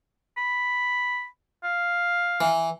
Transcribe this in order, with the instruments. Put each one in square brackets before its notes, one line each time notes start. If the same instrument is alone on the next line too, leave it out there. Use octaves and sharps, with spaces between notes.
[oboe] B5
F5
[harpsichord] E3